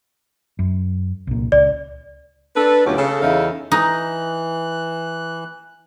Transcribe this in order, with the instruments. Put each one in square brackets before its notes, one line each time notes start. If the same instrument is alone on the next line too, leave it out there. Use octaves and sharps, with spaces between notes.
[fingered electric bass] F#2
C2 A#2
[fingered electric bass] C#2 [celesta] D5
[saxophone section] D4 A4 B4
D2 B2 F#3 C#4 F4 G4
C#3 A4
E2 C#3 D#4 E4 A4 F5
[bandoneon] E3 F#6 [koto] D#4